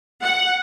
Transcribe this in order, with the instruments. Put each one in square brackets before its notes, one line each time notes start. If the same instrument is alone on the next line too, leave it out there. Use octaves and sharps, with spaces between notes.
[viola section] F#5